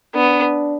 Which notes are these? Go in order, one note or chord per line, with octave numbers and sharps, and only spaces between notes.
B3 D4